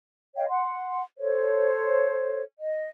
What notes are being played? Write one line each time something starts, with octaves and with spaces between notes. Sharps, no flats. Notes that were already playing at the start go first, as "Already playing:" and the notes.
C#5 D#5 F5 G5
F#5 C6
A4 C5 C#5
D#5